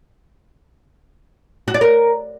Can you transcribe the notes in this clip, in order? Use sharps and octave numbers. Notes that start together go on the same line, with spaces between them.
F#4
D5
A#4